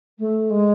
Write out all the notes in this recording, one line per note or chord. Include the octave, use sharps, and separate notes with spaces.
A3
G#3